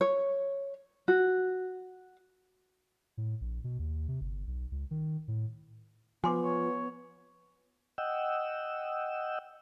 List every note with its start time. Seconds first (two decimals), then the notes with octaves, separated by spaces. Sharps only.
0.01 C#5
1.08 F#4
3.17 A2
3.41 A#1
3.64 B2
3.79 D#2
4.08 C3
4.21 G1
4.47 B1
4.72 C#2
4.91 D#3
5.28 A2
6.24 F3 B3 G#5 C6 D6
6.42 C#5
7.98 D#5 F#5 G5 E6